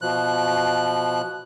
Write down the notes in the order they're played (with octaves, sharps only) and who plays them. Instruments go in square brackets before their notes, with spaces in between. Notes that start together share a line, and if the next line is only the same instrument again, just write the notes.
[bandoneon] B2 F3 F#6